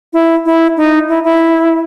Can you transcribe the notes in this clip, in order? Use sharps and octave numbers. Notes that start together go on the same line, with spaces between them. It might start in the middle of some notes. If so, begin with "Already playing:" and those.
E4
E4
D#4
E4
E4